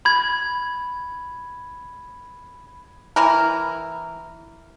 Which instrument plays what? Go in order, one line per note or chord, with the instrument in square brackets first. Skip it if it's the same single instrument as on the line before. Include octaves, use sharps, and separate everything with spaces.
[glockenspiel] B5 G#6
[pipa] E3 A#4